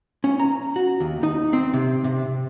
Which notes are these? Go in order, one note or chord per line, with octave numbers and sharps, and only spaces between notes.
C#4
A#5
F#4
D#2
D#4
C4
C3
C3